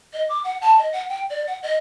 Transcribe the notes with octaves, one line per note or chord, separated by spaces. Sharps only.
D#5
D6
F#5
A5
D#5
F#5
G5
D5
F#5
D#5